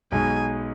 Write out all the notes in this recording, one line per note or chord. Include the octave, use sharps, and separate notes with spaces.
B1 B2 G#3 D#4 G#5